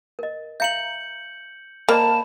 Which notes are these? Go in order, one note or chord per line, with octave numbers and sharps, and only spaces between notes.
A#4 D#5
E5 F5 A#5 G6 C#7 F#7
A#3 C5 D5 D#5 A5 B5